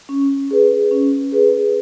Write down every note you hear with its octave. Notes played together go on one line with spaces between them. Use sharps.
C#4
G#4 B4
C#4
G#4 B4